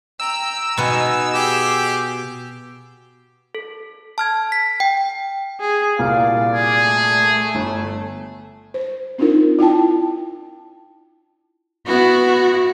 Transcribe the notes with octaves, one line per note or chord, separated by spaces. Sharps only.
G5 A#5 E6
B2 B3 D#4 D#5 G#5
G4 G#4
A4
A5 F6 G#6
B6
G5
G#4
C2 A#2 D5 F5
G#4 G#5
A3
G1
C5
C4 D4 D#4 F4 A#4
E4 F4 G5 A5
B3 E4 F#4